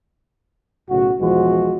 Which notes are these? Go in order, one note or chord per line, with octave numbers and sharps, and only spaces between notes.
B1 A2 C#3 F#4
B1 E2 F3 G#3 F#4 C5